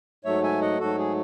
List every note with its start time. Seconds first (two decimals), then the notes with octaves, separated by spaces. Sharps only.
0.24 G#2 F#3 A3 C#5 E5
0.43 E5 G#5
0.61 D#5 F#5
0.80 G#2 F#3 A3 F#4 A4
0.98 G#4